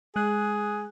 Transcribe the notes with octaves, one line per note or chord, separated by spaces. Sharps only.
G#3 G#4 F#6